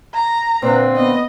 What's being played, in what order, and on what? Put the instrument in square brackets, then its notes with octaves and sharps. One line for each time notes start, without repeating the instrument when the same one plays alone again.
[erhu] A#5
[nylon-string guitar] A#2 D3 [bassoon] C4 [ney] B4
[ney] B3 [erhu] D#5